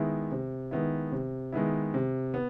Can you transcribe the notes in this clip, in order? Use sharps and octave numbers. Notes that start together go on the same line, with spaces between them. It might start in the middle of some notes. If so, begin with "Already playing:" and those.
Already playing: D#3 G#3 B3 E4
C3
D#3 G#3 B3 E4
C3
D#3 G#3 B3 E4
C3
B3